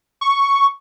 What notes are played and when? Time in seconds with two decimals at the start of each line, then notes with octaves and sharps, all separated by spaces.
0.21 C#6